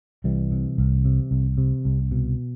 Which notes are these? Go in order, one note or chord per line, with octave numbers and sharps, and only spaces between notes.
C2 E3 G3
C3
C2
C3
C2
C3
C2
B2